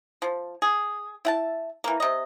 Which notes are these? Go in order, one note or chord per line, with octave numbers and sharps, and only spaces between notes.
F3
G#4
E4 F#5 A5
E3 A#3
C3 D#5